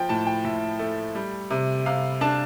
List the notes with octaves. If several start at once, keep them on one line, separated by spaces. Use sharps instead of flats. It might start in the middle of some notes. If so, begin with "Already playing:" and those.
Already playing: F3 G5
A2 A5
G5
A2 E5
A3
G3
C3
C3 F5
D4 A5